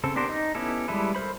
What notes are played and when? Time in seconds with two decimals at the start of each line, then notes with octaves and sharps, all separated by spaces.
0.04 C#3 C4 A4
0.16 B3 D4 G4 A#4 C5
0.29 D#4
0.55 B3 C#4 E4 G4 A4
0.88 G3 G#3 E4 A4 B4
1.15 A4 A#4 C5 B5